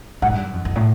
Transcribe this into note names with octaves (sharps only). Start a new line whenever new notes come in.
G#2 F#5
G2
F#2
F2
F2
A2